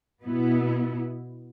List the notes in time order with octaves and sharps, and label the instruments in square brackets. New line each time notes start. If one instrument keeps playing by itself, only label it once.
[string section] B2 B3 E4